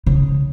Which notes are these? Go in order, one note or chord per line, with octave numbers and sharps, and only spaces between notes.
C#3